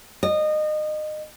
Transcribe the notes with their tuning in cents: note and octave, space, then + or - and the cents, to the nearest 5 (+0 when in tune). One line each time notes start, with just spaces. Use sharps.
D#5 -25